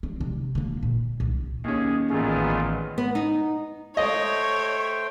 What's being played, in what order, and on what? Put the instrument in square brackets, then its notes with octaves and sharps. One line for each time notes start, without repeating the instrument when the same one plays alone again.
[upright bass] C4
C3
D3 A#3
A#2
C2
[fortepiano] D#2 C#4 [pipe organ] G#4
[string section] A1 D#3 B3 [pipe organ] A#2 A3 F4 [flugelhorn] G#4
[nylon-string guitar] B3
D#4
[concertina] A3 C5 G5 [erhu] C#5 [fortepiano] D#5